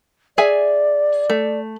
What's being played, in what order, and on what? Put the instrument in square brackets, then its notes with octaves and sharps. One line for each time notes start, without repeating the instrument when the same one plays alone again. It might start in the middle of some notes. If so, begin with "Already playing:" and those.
[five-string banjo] G#4 E5 G#5 [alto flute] D5
[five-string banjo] A3